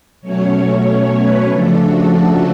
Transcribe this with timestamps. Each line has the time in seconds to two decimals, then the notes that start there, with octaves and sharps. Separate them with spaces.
0.21 B2 F#3 A3 C#4 C#5
0.85 C#5
1.17 B4
1.49 C#3 F3 A3 D4 A4
1.80 F#4
2.13 F#4